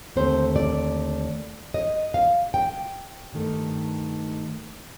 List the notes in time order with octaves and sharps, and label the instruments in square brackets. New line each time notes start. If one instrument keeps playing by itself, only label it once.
[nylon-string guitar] D#2 D3 A3 C4 C5
D5
D#5
F5
G5
G2 D#3 A3 D#4